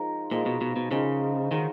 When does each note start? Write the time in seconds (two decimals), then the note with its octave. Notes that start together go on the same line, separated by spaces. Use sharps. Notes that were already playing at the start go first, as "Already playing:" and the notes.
Already playing: F3 G#3 D#4 A#4
0.31 A#2 F3 G#3 D#4 A#4
0.46 B2
0.61 B2
0.76 B2
0.91 C#3 F3 G#3 D#4 A#4
1.51 D#3 G#3 D#4 F#4 C#5